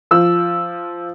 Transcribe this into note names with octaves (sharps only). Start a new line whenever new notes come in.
F3 E6